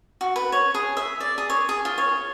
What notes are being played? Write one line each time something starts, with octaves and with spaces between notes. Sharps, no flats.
F#4
B4
C#5
G#4
E5
D5
G#4
C#5
G#4
F4
C#5